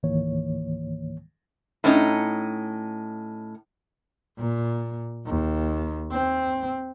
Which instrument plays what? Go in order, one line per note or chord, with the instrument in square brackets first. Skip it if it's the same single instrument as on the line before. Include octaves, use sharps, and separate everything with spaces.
[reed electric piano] C#2 G#2 D#3 E3 A#3 C#5
[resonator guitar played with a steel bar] A2 C#4 D#4
[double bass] A#2
D#2
C4